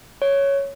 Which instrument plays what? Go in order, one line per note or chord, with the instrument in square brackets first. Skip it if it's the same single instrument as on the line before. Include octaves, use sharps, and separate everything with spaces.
[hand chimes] C#5